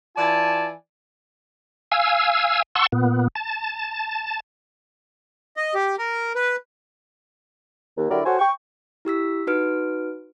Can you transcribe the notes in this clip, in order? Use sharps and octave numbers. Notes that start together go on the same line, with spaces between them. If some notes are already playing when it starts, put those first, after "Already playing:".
E3 F4 D5 G#5 A5
F5 G#5 E6
F#5 A5 C6 C#6 E6
A#2 B3
A5
D#5
G4
A#4
B4
D#2
D3 F#3 E4 G4 A#4 D5
F#4 A4 C5 C#5 F#5 G#5
G5 C#6
E4 G4 E6 B6
D#4 F#4 B4 F6 D7